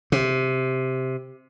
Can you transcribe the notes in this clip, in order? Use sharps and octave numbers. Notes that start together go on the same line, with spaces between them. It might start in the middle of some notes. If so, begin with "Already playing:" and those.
C3